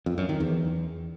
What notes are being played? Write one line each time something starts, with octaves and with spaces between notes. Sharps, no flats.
F2
F#2
D#3
E2